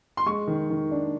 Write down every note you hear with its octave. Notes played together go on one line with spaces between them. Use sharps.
C6
G#3 C#6
D#3
D#3
D4